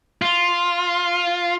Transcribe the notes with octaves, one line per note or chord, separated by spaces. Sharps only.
F4